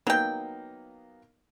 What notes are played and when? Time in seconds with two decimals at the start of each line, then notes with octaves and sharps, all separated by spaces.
0.07 F#3 A#3 B3 D#4 G5